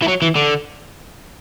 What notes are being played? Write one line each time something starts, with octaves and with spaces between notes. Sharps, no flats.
E3
F#3
E3
D3